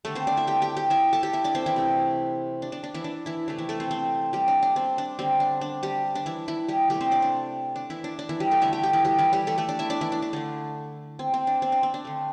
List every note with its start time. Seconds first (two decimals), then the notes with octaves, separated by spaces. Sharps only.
0.05 D3 G3 A3 A4
0.15 C4 C5
0.27 D4 D5
0.37 E4 E5
0.47 G4 G5
0.62 G4 G5
0.77 G4 G5
0.90 E4 E5
1.13 A4 A5
1.23 G4 G5
1.33 E4 E5
1.44 D4 D5
1.55 C4 C5
1.66 E3 E4
1.76 C3 A3
2.62 D4
2.72 D4
2.84 D4
2.94 E3 E4
3.04 D4
3.26 E3 E4
3.48 C3 E3 A3 D4
3.58 E3 E4
3.69 A3 A4
3.80 C4 C5
3.91 C4 C5
4.33 G3 G4
4.48 D4
4.63 D4
4.76 C4
4.98 D4
5.19 D3 G3 C4
5.40 D4
5.61 D4
5.83 G3 G4
6.15 D4
6.26 E3 E4
6.48 E3 E4
6.69 G3 G4
6.90 C3 G3 A3 G4
7.01 C4 C5
7.11 D4 D5
7.22 D4
7.76 D4
7.90 E3 E4
8.04 D4
8.19 D4
8.29 E3 E4
8.40 G3 G4
8.51 A3 A4
8.61 D3 G3 E4 E5
8.73 G4 G5
8.83 G4 G5
8.93 E3 E4
9.05 G3 G4
9.19 E3 E4
9.33 G3 G4
9.47 A3 A4
9.58 A3 A4
9.69 D4 D5
9.79 E4 E5
9.90 D4 D5
10.01 E3 E4
10.12 D4
10.22 D4
10.33 D3 A3 D4
11.19 C4
11.34 C4
11.47 D4
11.62 C4
11.72 D4
11.83 C4
11.94 D4
12.05 D3 A3